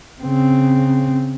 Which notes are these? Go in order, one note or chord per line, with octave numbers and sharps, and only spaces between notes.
C#3 C4